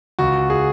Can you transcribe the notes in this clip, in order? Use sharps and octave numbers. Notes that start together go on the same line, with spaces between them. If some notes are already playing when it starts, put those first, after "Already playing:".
C#2 F#4
G#4